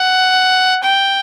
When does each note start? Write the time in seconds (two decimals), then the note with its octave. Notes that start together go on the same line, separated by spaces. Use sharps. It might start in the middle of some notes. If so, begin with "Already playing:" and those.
Already playing: F#5
0.83 G5